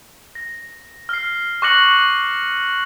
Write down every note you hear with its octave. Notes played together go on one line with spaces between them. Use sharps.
A#6
F6 C7
C#6 D6 F#6 A#6 C#7 F#7